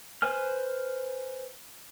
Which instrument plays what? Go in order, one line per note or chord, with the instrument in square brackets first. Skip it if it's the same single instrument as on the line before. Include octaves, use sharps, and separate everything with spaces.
[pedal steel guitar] B4 C5 G#5 F6